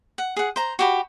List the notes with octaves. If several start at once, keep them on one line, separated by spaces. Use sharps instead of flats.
F#5
G#4 F#5
C5 A#5
F#4 G4 B5